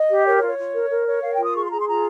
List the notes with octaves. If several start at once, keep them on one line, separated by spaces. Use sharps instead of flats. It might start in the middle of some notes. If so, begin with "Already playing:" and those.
Already playing: D#5
G4
A#4 C#5
C#5
F4
C#5
F4
A#4
A#4
C#5
A#4 F5
G5
F4
D#6
G#4 C#6
C6
G#4 A#5
C6
F4 A#5